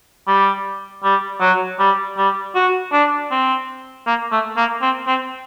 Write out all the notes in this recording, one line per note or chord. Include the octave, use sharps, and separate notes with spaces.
G3
G3
F#3
G3
G3
F#4
D4
C4
A#3
A3
A#3
C4
C4